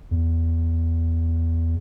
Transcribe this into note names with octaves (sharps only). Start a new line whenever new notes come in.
E2